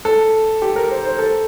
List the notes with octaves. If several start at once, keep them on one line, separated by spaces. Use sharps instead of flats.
A4
G4
A#4
C5
C5
A4